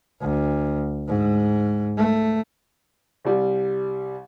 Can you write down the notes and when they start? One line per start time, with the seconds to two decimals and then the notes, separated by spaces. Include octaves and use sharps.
0.21 D2
1.08 G#2
1.97 A3
3.25 C2 G3